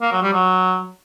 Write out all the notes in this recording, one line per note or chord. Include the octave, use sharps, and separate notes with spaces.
A#3
F#3
G3
F#3